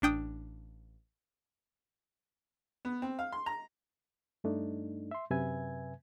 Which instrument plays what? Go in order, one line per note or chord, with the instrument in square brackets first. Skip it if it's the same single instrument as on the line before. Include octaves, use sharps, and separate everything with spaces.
[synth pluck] A1 D4 G5 D#6
[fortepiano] B3
C4
F5
C6
A#5
[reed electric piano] G2 A3 D4 D#4
E5 C6
F#2 C3 B4 E5 G#5 G#6